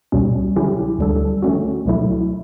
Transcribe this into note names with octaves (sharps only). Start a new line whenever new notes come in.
C#2 B2 G3 C#4
D3 F#3 C#4 E4 G4
D2 D3 G3 D4 A4
D3 A3 C#4 F#4
C#2 B2 F#3 A3 E4